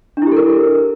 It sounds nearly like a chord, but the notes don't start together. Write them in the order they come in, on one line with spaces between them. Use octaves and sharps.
D4 E4 G4 A4 A#4